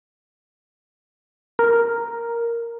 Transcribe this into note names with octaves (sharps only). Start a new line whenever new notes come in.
A#4